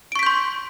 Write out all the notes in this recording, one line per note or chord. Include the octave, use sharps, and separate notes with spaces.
C6 C#6 G6 B6 D7